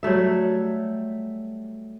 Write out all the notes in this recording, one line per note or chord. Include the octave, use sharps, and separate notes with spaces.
F#3 G3 A3 E5